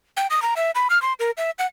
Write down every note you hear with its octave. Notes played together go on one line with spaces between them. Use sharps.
G5
D#6
A#5
E5
B5
F6
C6
A#4
E5
F#5